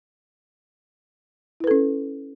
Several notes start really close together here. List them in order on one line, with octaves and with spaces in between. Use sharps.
E4 B4 A4 C#4